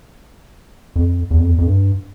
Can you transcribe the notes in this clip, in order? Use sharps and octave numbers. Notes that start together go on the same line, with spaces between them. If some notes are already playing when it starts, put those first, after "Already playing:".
F2
E2
F2
E2
F2
G2